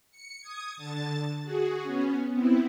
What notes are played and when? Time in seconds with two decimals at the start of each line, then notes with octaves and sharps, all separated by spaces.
0.11 C#7
0.41 D#6 G#6
0.74 D3 A5 A6
1.43 F#4 G#4
1.82 B3 C#4
2.32 B3 C4 E4